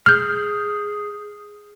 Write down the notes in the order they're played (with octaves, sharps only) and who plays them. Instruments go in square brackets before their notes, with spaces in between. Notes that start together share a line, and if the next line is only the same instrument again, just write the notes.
[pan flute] G#4 [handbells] F6 G6